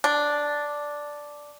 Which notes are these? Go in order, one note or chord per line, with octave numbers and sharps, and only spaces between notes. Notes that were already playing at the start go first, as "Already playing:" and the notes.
D4